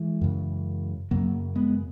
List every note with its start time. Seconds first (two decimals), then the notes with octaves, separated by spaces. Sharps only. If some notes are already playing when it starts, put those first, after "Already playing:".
Already playing: E3 G#3
0.21 F#2 C#3
1.11 F#2 C#3 F#3 A#3
1.55 G#3 B3